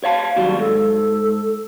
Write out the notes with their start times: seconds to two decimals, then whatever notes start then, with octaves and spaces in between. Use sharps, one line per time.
0.04 C#5 F5 A5
0.36 D#2 F#3 G3 F#4
0.59 G#2 A4